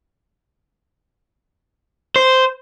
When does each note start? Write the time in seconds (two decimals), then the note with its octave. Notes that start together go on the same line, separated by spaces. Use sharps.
2.16 C5